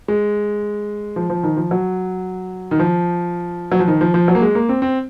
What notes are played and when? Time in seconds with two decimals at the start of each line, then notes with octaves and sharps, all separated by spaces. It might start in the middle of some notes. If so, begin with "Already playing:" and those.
0.08 G#3
1.16 F3
1.30 F3
1.43 D#3
1.57 F3
1.71 F#3
2.71 D#3
2.79 F3
3.72 F#3
3.79 F3
3.88 D#3
4.01 F3
4.14 F3
4.28 F#3
4.35 A#3
4.42 G#3
4.55 A#3
4.69 C4
4.82 C4